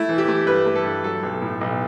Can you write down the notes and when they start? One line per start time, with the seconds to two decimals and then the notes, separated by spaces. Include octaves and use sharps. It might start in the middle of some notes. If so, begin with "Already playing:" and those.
Already playing: A3 E4
0.09 E3
0.18 G4
0.28 A3
0.47 G2 B4
0.66 A3
0.75 A4
0.84 G2
1.03 F#3 A4
1.23 B1
1.42 A2
1.61 B1